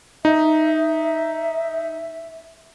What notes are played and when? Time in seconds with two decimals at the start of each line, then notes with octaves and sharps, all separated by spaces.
0.25 D#4 E5